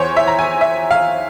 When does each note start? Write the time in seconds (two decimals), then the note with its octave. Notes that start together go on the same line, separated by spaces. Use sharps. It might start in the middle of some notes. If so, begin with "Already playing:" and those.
Already playing: E2 E3 C5 C#5
0.17 E5
0.28 A#5
0.39 G#5
0.61 E5
0.91 F5